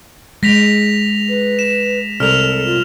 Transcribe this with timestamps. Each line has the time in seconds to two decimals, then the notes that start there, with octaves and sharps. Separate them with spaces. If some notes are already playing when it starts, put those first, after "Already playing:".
0.43 G#3 A#6 B6 F7
1.29 B4
1.59 E7
2.20 C2 A4 F6 F7
2.66 F4